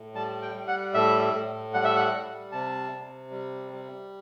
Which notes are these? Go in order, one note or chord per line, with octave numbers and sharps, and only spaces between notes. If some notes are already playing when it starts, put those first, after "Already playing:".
Already playing: A2
G3 A5
G5
G3
F#5
A2 E5
A2
G3 F#5
E5
F#5
G3
C3 A5
C3
G3
G3